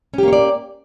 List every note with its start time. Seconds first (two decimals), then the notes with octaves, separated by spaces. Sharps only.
0.14 C#4
0.18 G4
0.23 A#3
0.28 C#5
0.33 D5